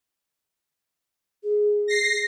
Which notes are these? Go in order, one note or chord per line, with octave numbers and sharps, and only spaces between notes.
G#4
A#6 C7